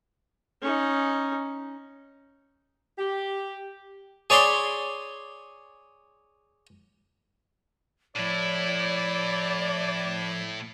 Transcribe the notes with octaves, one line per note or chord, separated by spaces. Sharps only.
C#4 D#4
G4
G#4 C#5 D5 B5 C6
A2 F3 E4 C#5 D5 G#6 C7